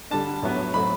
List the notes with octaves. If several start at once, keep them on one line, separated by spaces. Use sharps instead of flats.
D3 G3 D4 A5
A2 F#3 B3
A2 F#3 A3 C4 B5